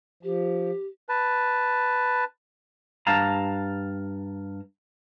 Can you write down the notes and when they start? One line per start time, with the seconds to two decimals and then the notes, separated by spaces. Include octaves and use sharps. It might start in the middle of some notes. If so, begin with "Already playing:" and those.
0.23 F3 G4
1.09 B4 A5
3.07 G2 F5 A5 A#5